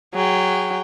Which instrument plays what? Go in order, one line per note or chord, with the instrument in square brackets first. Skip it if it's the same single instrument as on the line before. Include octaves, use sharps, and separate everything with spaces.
[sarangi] F#3 [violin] G#4 G5